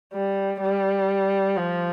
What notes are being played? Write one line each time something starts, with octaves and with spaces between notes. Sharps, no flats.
G3
G3
F3